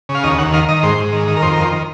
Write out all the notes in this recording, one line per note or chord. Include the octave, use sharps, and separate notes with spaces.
C#3
F5
D#2 D#5
D#2 F#5
D#3 F5
D#3 D#5
G#2 C5
G#2
D#3
D#3
A#4
F2 C5
A#4
F2
C5
D#3